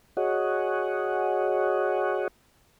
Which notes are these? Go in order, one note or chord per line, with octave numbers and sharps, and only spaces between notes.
F#4 G#4 C#5 D#5 F#5